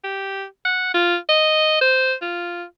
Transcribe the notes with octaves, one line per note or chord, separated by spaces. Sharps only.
G4
F#5
F4
D#5
C5
F4